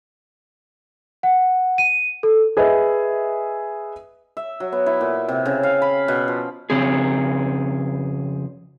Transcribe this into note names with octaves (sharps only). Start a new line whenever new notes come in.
F#5
D#7
A4
G#4 B4 D#5 E5
E5
F#3
B3
E4
A#2
C3
C#3
F5
B5
B2
F3
F2 C#3 C4 G#4